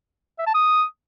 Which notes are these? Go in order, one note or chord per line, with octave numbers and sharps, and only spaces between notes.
E5
A5
D#6